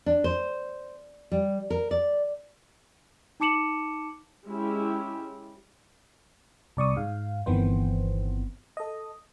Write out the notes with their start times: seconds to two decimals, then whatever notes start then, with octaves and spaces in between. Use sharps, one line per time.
0.06 D4
0.24 C5
1.32 G3
1.70 A#4
1.91 D5
3.40 D#4 A5 D6 C#7 E7 F#7
4.46 G#3 C#4 E4 G4
6.77 C2 D5 C#6 D#6
6.96 G#2 F5
7.46 G1 D#3 E3 B3 C4 C5
8.77 A4 D#5